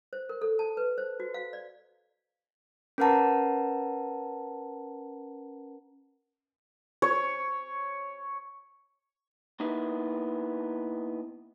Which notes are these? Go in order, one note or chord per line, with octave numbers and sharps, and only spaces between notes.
C5
A#4
A4
A5
B4
C5
F#4
F5
D5
C#4 A#4 B4 F#5 A5 A#5
C#5
A#3 B3 D#4 E4